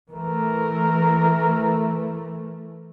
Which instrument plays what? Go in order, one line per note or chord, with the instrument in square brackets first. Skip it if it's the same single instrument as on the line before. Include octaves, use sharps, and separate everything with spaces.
[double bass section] E3 A3 [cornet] A#4